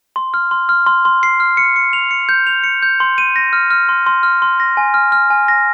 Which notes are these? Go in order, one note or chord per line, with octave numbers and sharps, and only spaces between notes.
C6
F6
C6
F6
C6
C6
C7
F6
C#7
C#7
F7
C#7
G6
F7
C#7
G6
C6
D#7
A#6
F6
F6
C6
C6
F6
C6
A#6
G#5
F6
F6
G#5
A#6